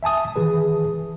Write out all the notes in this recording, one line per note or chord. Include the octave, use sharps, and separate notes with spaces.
E5 G#5 A5 D#6
D#3 E3 G#4 B4